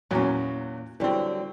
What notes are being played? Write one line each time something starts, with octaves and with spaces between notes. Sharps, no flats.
E2 A#2 F#3 C#4
D3 E3 F#3 G3 C4